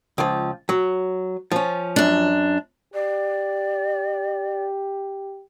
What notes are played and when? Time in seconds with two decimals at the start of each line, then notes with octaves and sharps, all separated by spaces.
0.18 C#2 F3
0.69 F#3
1.52 F3 C#4
1.96 F#2 D4
2.94 G4 D5